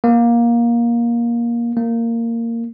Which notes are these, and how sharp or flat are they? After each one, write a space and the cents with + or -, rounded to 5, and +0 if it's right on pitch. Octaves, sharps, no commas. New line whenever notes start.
A#3 +15
A#3 -15